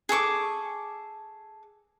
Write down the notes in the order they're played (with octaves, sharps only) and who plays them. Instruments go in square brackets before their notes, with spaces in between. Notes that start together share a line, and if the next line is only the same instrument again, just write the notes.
[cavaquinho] G#4 A4 C#6 D6